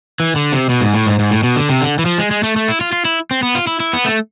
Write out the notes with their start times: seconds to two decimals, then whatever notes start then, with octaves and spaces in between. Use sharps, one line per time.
0.20 E3
0.36 D3
0.53 C3
0.69 B2
0.81 G#2
0.94 A2
1.07 G#2
1.19 G#2
1.31 A2
1.43 B2
1.56 D3
1.69 C3
1.81 D3
1.99 E3
2.06 F3
2.18 G#3
2.31 G#3
2.43 A3
2.56 A3
2.68 E4
2.81 F4
2.92 F4
3.05 E4
3.31 C4
3.43 B3
3.55 F4
3.67 E4
3.80 E4
3.93 B3
4.05 A3